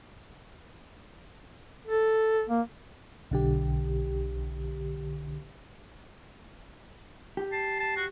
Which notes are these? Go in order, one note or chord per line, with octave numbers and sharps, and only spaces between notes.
A4
A#3
B1 D3 G4
G4
A5 C7
A5
F#4